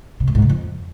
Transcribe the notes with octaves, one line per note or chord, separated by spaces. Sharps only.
C3
A2
G#2
C#3
F2